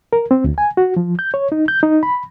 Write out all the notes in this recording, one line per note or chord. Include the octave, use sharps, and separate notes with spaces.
A#4
C4
D2
G#5
F#4
F3
G6
C#5
D#4
G6
D#4
B5